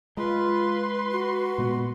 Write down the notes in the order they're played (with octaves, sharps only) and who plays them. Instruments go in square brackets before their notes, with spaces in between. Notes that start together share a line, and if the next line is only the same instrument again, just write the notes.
[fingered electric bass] G#3 [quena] F4 [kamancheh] B4 C6
[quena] F#4
[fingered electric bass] A#2 G#3 B3